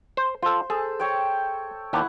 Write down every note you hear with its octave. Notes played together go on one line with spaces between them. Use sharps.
C5
F4 A4 C5
G#4 A4
A4 C#5 G5
D#2 E4 G4 F#5 A5